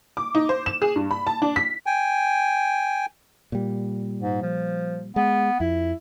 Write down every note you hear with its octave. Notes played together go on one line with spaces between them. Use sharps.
D6
D#4
C5
E7
G#4
G2
B5
A5
D4
B6
G5 G#5
A#2 G3
G#2
F3
G#3 B3
F2 E4